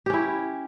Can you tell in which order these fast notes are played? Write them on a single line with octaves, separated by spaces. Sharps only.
G4 C#4 E4